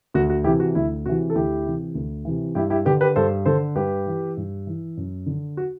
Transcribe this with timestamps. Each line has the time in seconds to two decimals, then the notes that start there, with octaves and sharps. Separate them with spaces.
0.14 D2 F#4
0.30 F#4
0.44 C3 E3 E4 G4
0.60 F#4
0.75 D2 E4
1.05 C3 E3 F#4
1.30 A4
1.35 D2 E4 G4
1.66 C3 E3
1.95 D2
2.25 C3 E3
2.55 G2 E4 G4
2.70 E4 G4
2.85 D3 G4 B4
3.01 G4 B4
3.16 G2 A4 C5
3.46 D3 A4 C5
3.76 G2 G4 B4
4.06 E3
4.37 G2
4.67 E3
4.97 F#2
5.26 D3
5.57 F#4